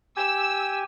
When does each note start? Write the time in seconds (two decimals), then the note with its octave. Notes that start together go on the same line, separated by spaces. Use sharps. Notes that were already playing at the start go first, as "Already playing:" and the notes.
0.16 G4 G#5 E6